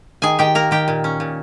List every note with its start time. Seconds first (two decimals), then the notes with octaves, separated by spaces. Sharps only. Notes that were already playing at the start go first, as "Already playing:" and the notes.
0.22 D#3 G#4 G#5
0.39 D#3 G4 G5
0.55 A#3 A#4 A#5
0.71 D#3 G4 G5
0.88 A#2
1.04 C#4
1.20 A#2